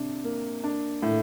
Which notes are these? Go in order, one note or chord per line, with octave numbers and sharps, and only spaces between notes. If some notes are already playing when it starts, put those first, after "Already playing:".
Already playing: C3 D4
A#3
D4
A2